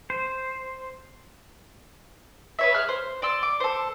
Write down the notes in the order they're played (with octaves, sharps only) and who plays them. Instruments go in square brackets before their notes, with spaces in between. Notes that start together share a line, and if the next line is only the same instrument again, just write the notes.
[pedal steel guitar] C5
[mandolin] B4 C#5 E5
G#4 E5 F6 F#6
C5
D5 C6 E6
D6
A4 C5